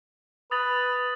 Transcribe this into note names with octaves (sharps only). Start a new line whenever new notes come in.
B4 D#6 A6 F#7